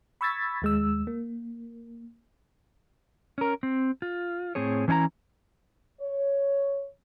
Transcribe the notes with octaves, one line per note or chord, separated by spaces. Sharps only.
B5 C#6 E6 G#6 A6 B6
D#2 G#3 E6
A#3
C#4 A#4
C4
F4
A2 C4 G#4 C#5
E3 C#4 D4 E4 A#5
C#5